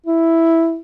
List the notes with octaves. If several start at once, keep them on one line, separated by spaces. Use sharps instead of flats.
E4